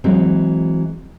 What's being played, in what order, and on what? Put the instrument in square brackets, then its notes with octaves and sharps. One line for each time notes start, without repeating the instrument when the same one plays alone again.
[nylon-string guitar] E3 F#3 G#3 C4